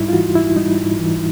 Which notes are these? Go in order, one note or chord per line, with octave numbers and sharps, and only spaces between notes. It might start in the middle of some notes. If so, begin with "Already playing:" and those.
Already playing: G#2 G3 D#4 E4
F4
E3 F#4
G#2 E4
G3 D#4
G#2
E3